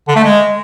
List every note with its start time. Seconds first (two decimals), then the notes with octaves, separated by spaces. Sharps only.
0.08 D3
0.16 A3
0.23 G#3